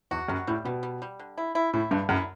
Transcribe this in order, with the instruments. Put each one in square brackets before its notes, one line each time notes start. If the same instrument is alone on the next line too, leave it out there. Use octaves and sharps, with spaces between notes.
[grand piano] E2 [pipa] F#4
[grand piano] F#2 [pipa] G3
[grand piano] A2 [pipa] G3
[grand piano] B2 [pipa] G3
[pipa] G3
G3
D3
E4
E4
[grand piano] A2 [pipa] E4
[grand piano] G2 [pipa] D3
[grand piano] F#2 [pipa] E4